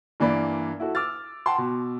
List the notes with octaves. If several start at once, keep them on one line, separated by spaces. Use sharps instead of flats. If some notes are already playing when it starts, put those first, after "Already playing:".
G2 E3 A#3 D5 B5
E4 F#4 A4
D6 E6 F6 A6
F#5 G5 A5 C6
B2